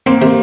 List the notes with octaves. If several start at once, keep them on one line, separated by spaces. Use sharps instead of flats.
A#3 C4
C3